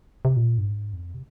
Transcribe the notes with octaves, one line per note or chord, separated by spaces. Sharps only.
C3
A#2
G2
G#2
F2
C3